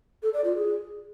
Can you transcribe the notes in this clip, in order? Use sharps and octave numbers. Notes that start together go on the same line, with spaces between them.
A4
D5
F4
G#4